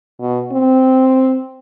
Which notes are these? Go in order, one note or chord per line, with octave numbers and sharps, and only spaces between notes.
B2
C4